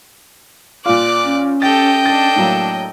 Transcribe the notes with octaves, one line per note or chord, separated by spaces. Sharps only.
A#2 F4 D5 D6 F#6
C#4
G4 A4 D#5 G5 A6
D4 A4 A6
A2 F#3 A#3